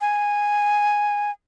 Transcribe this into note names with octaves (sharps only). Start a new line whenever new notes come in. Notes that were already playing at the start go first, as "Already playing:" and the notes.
G#5